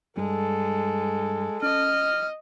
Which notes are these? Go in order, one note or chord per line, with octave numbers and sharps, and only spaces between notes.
G2 G3 G#3 A4
C#4 D#5 F6